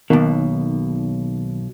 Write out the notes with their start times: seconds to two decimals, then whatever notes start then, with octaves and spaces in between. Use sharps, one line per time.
0.10 B1 B2 D#3 A#3